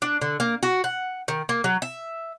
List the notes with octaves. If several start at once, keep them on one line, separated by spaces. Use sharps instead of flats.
D4
D3
A#3
F#4
F#5
D#3
A#3
F#3
E5